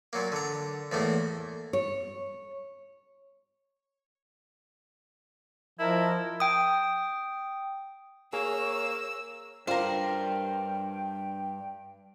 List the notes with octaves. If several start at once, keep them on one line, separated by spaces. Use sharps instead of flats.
A#2 F#3 A#3
D3 A#5
E2 A2 A3 A#3
C#5
F3 E4 A#4 D#5 A5
G5 D#6
A#3 G#4 C#5 E6
G2 F4 A#4 C5 D5 G5